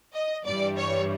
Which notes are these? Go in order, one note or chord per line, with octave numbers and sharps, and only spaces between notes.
D#5
G2 E3 G3 D5
C#5